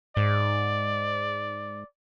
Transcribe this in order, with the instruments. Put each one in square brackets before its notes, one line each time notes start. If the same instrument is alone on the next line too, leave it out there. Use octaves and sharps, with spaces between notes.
[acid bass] G#2 [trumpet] D5